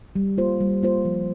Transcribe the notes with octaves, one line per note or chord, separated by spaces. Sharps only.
G3
A#3 F4 C5
G3
A#3 F4 C5
F3